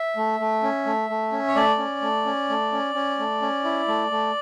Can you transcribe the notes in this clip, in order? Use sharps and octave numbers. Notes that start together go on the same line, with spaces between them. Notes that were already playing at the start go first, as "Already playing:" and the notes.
Already playing: E5
A3
A3
C#4
A3
A3
C#4
C#5
A3 D5
C#4
A3
C#4
A3
C#4
C#4
A3
C#4
E4
A3
A3